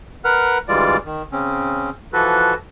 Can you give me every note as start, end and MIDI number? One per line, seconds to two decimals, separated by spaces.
0.25 0.58 70
0.25 0.58 71
0.25 0.58 78
0.25 0.58 89
0.68 0.97 38
0.68 0.97 52
0.68 0.97 55
0.68 0.97 56
0.68 0.97 65
0.68 0.97 74
1.05 1.22 51
1.32 1.90 49
1.32 1.90 60
1.32 1.90 61
2.13 2.54 52
2.13 2.54 53
2.13 2.54 66
2.13 2.54 69
2.13 2.54 71